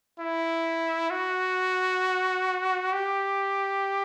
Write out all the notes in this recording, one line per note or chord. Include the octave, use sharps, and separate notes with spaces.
E4
F#4
G4